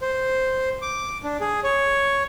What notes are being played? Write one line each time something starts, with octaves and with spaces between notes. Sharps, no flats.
C5
D6
D4
G#4
C#5